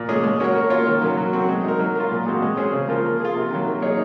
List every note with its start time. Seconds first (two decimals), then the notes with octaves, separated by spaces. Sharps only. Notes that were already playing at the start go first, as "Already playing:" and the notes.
Already playing: A#2
0.09 G#3 C#4 G#4
0.23 G#3
0.40 C#4 F#4 A#4 C#5
0.56 A#3
0.70 F4 A#4 C#5
0.87 D#3
1.02 F#3 A#3 C#4
1.17 F#3
1.33 C4 F#4
1.49 G#3
1.64 D#4 A#4
1.79 F#3
1.95 A#3 F4
2.11 A#2
2.26 G#3 C4 F#4
2.42 G#3
2.57 C#4 G#4 C5
2.73 C#3
2.88 F3 A#3 F4 A#4
3.05 A#3
3.20 F4 G#4
3.35 C3
3.51 D#3 F#3
3.66 A#3
3.82 D#4 G#4 C#5